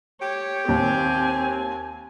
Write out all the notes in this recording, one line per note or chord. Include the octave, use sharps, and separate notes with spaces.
G4 C#5
D#2 C4 G#5